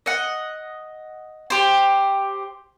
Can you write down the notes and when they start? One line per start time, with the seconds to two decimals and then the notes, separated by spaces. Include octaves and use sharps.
0.06 D#5 F#5
1.50 G4 C5